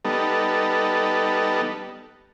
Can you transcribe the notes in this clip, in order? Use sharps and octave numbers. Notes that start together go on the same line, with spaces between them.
G3 B3 D#4 A4